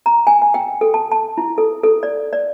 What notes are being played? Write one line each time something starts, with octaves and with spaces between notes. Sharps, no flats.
A#5
G#5
G#5
G5
A4
A5
A5
E4
A4
A4
D5
D5